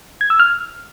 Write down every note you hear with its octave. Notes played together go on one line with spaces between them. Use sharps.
G#6
E6
F6